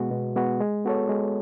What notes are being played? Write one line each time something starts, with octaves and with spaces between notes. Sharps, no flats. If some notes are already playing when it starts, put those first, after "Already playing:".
Already playing: B2 G#3 B3 F#4
B2
G#3 B3 F#4
G#3
B3 F#4 A4 C#5
G#3